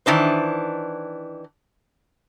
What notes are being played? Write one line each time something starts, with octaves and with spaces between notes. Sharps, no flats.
D#3 E3 D4 C5